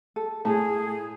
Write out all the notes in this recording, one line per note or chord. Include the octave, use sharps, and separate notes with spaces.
A4
A2 G#4 G#5 A5